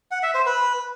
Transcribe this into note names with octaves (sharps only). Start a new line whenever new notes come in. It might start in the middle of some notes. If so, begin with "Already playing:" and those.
F#5
E5
C5
B4